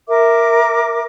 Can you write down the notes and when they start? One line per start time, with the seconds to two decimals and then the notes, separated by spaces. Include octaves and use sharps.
0.09 A#4 E5 D6